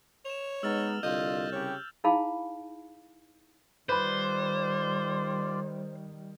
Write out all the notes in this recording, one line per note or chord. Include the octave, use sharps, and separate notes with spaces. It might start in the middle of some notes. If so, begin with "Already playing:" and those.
C#5 E7 F7
G#3 B3 D#4 E6 F6 A6
C2 D3 F4 D#5 G6
C#3 G4 C#5
D#4 E4 G#4 F5 A5 B5
D#3 G3 F4 B4 C5 D5 B5